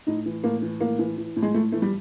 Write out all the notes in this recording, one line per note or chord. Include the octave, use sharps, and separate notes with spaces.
A2 D#4
E3
A2 A#3
E3
A2 A#3
E3
E3
A2
G#3
A2 A3
E3 A3
G3